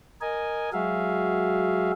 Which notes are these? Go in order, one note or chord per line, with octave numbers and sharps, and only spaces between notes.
A#4 D#5 G#5
F#3 G#3 F#4 G#4 E5 F5